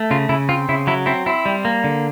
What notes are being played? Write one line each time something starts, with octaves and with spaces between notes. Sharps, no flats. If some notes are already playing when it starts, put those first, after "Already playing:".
Already playing: A3
C#3 F4
C#3 E4
C4 F4
C#3 E4
F#3 E4
C4 E4
C4 E4
G3
A#3
D3